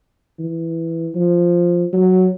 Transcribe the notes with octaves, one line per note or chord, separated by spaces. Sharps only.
E3
F3
F#3